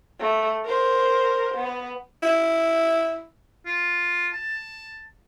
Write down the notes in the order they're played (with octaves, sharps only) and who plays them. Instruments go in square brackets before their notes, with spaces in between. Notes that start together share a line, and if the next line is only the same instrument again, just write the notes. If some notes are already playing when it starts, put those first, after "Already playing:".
[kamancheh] A3
A#4 C5
B3
[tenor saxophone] E4
[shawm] F4
A5